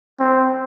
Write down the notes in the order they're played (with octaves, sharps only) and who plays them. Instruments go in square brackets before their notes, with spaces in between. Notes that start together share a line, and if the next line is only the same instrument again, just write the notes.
[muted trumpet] C4